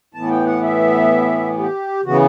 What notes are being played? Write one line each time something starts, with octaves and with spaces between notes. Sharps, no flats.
A2 E3 B3 A5
G5
F#5
E5
G4
C#3 E3 B3 F#4